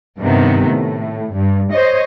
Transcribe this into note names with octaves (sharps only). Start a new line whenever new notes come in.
G2 C3 D#3 B3
A2
G2
C5 C#5 D#5